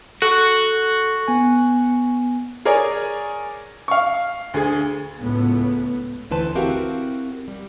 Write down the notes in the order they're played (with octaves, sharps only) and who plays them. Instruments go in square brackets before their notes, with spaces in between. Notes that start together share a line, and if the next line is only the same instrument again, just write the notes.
[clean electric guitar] F#4 [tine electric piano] A4
[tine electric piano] B3 G#5
[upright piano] G#4 A#4 C#5 D5 G#5
F5 C#6
D2 G#4
[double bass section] C#2 A2 A3 B3
[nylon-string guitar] D2 E3 B4 C5 A5
C4 E4 F#4 G4 A#4 F5
G3